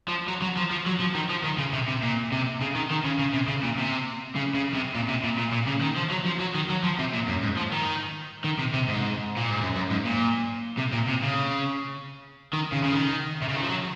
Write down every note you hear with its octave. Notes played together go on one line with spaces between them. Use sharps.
F3
F#3
F#3
F3
F3
F#3
F3
D#3
F3
D#3
C#3
C3
C3
A#2
C3
C#3
D#3
D#3
C#3
C#3
C3
C#3
A#2
C3
C#3
C#3
C3
A#2
C3
A#2
A#2
A#2
C#3
D#3
F3
F#3
F3
F#3
D#3
F#3
F3
C3
A#2
F#2
G#2
F3
D#3
D#3
C3
C3
G#2
A#2
G#2
F#2
F#2
G#2
A#2
C3
A#2
C3
C#3
D#3
C#3
C#3
D#3
C3
C#3
D#3
F3
F#3